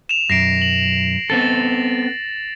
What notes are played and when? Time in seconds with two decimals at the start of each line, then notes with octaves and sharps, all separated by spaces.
0.09 E7 F7
0.30 B1 F#2 A#6 C7 D7
0.62 F#7
1.30 B3 C4 A4 A6